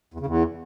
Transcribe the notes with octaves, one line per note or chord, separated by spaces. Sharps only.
E2
C#3
E2